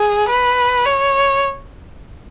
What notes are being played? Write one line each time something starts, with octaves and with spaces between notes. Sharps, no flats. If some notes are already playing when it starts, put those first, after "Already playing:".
Already playing: G#4
B4
C#5